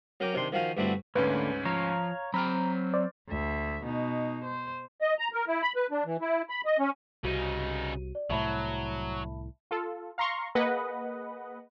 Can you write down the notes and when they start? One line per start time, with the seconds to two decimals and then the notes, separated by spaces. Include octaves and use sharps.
0.20 F#3 C#4 A#4 G5 D6
0.34 C3 D#3 D4 C6
0.52 D#3 F3 F#4 F5 G#5
0.77 G2 D3 A3 C4 E4 F#4
1.15 D2 G#2 D3 A3 A#3 C#4 B4
1.65 F3 C#5 F5 A#5
2.34 F#3 C4 G5 A#5 B5 F6
2.94 C5 D5
3.28 D2 E5
3.84 B2 D#4
4.45 C5
5.01 D#5
5.19 A#5
5.33 A#4
5.48 E4
5.62 B5
5.76 B4
5.91 D4
6.05 E3
6.21 E4
6.49 B5
6.66 D#5
6.79 C#4
7.24 C2 C#3 D#4 F#4 G4 D#7
8.15 D5
8.30 C2 A2 F#3 E5 A5 B5
9.71 F4 A4
10.18 F5 A#5 C6 C#6
10.55 A#3 G#4 B4 D#5 F#5